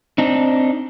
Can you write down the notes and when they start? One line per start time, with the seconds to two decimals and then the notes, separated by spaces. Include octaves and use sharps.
0.18 C4 D4 D#4